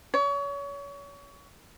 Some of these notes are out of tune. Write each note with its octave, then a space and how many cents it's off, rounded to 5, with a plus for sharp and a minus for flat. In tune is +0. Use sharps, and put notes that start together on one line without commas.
C#5 +30